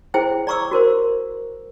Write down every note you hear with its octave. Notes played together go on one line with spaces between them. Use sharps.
E4 G#4 C5 G5
D5 A#5 C#6 D6 E6
F#4 A#4 C5